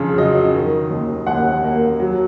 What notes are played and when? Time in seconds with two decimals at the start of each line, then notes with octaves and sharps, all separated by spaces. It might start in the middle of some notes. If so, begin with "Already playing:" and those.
Already playing: F2 C#3
0.17 F#3 D#5
0.54 D#3
0.91 D#2
1.27 D#2 F#5
1.64 A#3
2.00 F#3